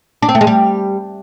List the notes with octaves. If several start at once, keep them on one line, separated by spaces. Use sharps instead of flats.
D4
C4
A3
G#3
G3